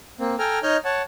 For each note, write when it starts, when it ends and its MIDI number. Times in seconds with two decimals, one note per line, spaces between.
0.20 0.36 58
0.20 0.36 60
0.39 0.59 69
0.39 0.59 79
0.39 0.59 80
0.39 0.59 82
0.39 0.59 89
0.63 0.77 63
0.63 0.77 73
0.63 0.77 75
0.63 0.77 89
0.63 0.77 91
0.85 1.02 73
0.85 1.02 78
0.85 1.02 81